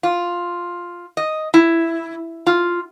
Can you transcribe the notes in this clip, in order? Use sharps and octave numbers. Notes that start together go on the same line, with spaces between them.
F4
D#5
E4
F4